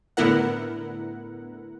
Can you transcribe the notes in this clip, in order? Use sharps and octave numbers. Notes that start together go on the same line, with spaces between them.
A2 D3 B3 E4 A#4 F#5